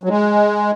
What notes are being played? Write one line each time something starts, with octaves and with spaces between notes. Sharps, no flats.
F#3
G#3